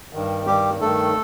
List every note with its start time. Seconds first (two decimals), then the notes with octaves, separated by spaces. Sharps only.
0.13 G2 D#3
0.46 G2 D#3 G3 G4
0.80 G2 D#3 A3 A4